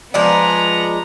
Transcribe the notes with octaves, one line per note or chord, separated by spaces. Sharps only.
F3 G#3 B3 D5 A#5